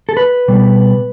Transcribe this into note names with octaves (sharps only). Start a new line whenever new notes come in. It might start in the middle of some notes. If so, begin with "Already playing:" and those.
A4
B4
B2 G3 B3